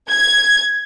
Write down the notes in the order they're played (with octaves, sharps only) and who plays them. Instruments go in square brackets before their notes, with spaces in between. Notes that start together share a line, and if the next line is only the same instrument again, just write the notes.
[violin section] G#6